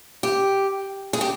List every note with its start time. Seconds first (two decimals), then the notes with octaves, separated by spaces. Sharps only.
0.23 G4
1.13 G#4
1.21 G4